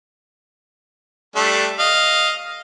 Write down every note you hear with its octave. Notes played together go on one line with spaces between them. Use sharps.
G3 A3 D4
D#5 F5